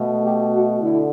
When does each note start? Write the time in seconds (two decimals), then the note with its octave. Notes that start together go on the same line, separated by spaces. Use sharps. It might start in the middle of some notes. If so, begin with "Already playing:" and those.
Already playing: B2 A3
0.23 G4
0.52 F#4
0.81 D3 E4